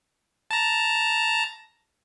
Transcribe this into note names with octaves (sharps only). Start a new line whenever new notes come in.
A5 A#5